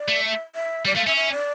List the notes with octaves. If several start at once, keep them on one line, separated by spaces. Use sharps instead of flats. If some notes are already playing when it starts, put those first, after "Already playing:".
Already playing: D5
A3
E5
E5
G3 D5
A3 F5
C#4 E5
E5
D5